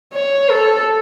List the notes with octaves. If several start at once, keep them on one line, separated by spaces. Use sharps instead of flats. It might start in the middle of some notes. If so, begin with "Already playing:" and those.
C#5
A4